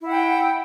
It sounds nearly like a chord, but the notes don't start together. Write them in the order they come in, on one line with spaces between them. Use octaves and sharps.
E4 F#5 G5